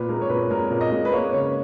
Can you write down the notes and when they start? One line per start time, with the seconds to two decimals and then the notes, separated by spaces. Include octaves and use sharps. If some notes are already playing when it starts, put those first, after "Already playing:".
Already playing: A#2 B4
0.09 G#3 A#4
0.21 C#5
0.30 A#2 B4
0.50 G#3 A#4
0.70 A#2
0.81 D#5
0.92 G#3
1.05 B4
1.12 A#3 C#5
1.33 C#3 C#5